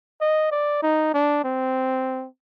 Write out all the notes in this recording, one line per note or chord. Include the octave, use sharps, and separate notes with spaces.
D#5
D5
D#4
D4
C4